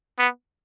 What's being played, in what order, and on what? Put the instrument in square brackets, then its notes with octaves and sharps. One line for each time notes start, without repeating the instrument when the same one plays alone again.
[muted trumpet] B3